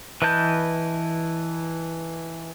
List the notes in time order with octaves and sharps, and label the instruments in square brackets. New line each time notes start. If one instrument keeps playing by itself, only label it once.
[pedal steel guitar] E3 B4 D#5 A5 G6